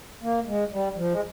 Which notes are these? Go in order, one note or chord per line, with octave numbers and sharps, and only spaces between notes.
A#3
G#3
G3
F3
G#3